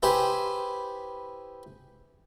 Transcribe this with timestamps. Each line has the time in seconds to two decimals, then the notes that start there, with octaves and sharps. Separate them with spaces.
0.03 E4 G4 G#4 B4 C5